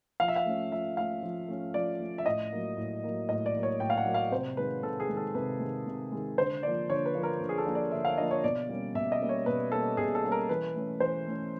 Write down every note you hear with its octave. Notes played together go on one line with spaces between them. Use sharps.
F3 F5
E5
F5
A3 C#4
F3 E5
A3 C#4 F5
F3
A3 C#4
F3 D5
A3 C#4
E5
A2 D#5
F#3 A#3
A2
F#3 A#3
A2 D#5
D5
F#3 A#3
C#5
A2 G5
F5
F#5
F#3 A#3
F5
C3 C5
D#3 G#3 B4
C3 A4
G#4
D#3 G#3
A4
C3 B4
D#3 G#3
C3
D#3 G#3
D3 C5
F3 A#3 D4 D5
D3 C#5
B4
F3 A#3 D4
A#4
D3
G#4
A4
F3 A#3 D4
D5
D3 E5
F5
F3 A#3 D4 D#5
C#5
B2 D5
G3 A#3 C#4
B2 E5
D#5
G3 A#3 C#4
C#5
B2 B4
G3 A#3 C#4 A4
B2 G#4
A4
G3 A#3 C#4
A#4
E3 B4
A3 C#4
E3 C5
A3 C#4